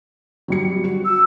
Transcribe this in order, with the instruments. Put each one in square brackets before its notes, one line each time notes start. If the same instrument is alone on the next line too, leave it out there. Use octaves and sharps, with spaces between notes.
[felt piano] F#3 G3 C#7
F#4
[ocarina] E6